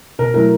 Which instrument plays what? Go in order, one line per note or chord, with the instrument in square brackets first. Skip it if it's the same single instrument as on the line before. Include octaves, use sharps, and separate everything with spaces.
[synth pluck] B2 [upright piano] A#4
[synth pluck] F#3 A3 C#4 E4 [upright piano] A#4